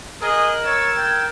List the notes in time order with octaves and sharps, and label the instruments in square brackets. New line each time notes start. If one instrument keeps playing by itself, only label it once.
[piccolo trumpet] G#4 [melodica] A#4 [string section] D#5 F#6
[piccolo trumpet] C#5 [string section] E6 A6 [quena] G#6
[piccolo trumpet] G5